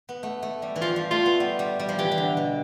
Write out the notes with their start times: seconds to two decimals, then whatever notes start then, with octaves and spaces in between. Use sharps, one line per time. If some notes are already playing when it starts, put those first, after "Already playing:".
0.09 B3
0.23 A3
0.43 A3
0.62 G3
0.76 E3
0.81 F3 F4
0.96 G3
1.11 A3 F4
1.26 B3
1.40 G3
1.59 G3
1.79 G3
1.89 F3
1.99 E3 G4
2.12 E3
2.18 D3
2.37 B2